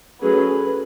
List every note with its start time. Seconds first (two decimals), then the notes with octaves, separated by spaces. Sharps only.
0.22 F#3 A3 C#4 G#4 B4